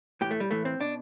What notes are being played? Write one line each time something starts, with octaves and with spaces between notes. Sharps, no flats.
A2 E3 G4
A3
G3
A2 E3 A3
C4
B2 D4